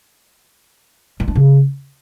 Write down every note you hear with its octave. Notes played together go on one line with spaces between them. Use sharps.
G3
D4
C#3